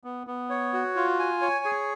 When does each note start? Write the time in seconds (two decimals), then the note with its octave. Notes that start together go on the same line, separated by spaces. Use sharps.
0.04 B3
0.27 B3
0.50 C#5
0.73 F#4
0.96 F4
1.19 G#5
1.41 C#5
1.65 G#4